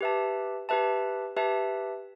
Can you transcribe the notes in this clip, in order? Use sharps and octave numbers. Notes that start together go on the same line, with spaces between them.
G4 B4 E5 A5
G4 B4 E5 A5
G4 B4 E5 A5